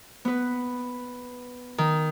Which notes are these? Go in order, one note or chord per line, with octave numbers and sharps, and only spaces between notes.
B3 B4
D#3